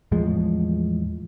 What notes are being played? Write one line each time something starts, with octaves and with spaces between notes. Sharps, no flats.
E2 A2 F3 G#3